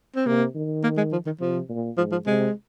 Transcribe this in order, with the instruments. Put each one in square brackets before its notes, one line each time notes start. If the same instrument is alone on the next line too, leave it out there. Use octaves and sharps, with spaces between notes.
[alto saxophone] C4
[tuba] C3 [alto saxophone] A#3
[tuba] D#3
[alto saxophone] A#3
G#3
F3
D#3
[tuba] C3 [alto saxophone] F3
[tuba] A#2
[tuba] G#2 [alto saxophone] F3
[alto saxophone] F3
[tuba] C3 [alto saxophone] G#3